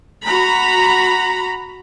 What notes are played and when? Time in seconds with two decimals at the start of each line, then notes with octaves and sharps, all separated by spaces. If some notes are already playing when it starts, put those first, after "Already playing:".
0.25 F#4 A#5 B5